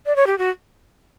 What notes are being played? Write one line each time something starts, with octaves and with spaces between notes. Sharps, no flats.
D5
C#5
G4
F#4